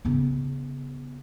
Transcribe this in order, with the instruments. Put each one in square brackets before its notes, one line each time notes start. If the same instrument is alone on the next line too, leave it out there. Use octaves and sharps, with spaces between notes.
[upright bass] C#3 B3